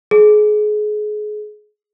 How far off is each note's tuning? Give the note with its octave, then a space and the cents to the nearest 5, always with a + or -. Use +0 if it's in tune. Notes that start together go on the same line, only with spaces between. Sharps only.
G#4 +30